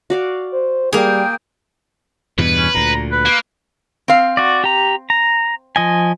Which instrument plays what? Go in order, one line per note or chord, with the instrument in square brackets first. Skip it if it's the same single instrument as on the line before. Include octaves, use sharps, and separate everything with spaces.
[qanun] F#4 D5 F5
[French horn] C5
[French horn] G3 [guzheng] A#3 G#4 [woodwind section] G5
[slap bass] E2 G2 B2 [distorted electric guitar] B4
[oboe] C#4
[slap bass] D2 A#2 [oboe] A#5
[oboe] B4
[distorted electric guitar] A#3
[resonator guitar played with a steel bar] C4 F5
[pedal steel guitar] F#4 D5
G4 A#5
A#5
F3 D#5 G#5